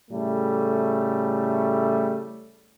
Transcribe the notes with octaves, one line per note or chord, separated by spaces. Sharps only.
A2 C#3 G3 A3